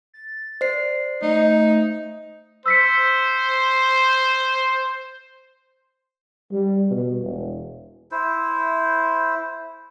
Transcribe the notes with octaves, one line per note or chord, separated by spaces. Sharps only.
A6
C5 D5 C7
A3 D#4
C5 E6 B6 C#7
G3
B2
E1
E4 C5